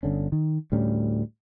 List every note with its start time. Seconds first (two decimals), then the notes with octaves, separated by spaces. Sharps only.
0.03 G1 D3 C#4
0.32 D#3
0.72 D2 A2 G3 C#4